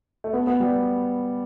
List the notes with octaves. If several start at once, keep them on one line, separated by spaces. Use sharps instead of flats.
A3
B3
B3
G3